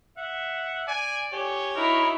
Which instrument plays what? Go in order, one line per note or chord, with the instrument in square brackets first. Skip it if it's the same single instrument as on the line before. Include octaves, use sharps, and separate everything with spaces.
[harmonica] E5 [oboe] F#5
[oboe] D5 [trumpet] G#5
[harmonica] G4 G#5 [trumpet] C#5
[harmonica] D#4 F#4 [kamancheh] E4 [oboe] A#4